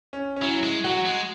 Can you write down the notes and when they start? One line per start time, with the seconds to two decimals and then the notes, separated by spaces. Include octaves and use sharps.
0.13 C#4
0.36 C#4
0.42 F#3 E4
0.63 G#3
0.84 F#3 F#4
1.05 G#3